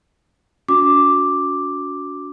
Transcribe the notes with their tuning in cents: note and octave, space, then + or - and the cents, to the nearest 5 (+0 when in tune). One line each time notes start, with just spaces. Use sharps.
D4 -45 F#4 -15 D6 +0